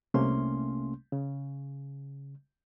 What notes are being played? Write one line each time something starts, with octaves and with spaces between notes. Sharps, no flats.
C2 C3 A3 A#3 C#4 C6
C#3